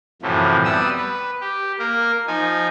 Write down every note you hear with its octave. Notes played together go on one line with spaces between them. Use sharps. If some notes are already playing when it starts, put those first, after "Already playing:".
F#2 A2 C3 E3 F3
G3 B3 D#6 E6
B4
G4
A#3 A#4
F3 D#4 G#5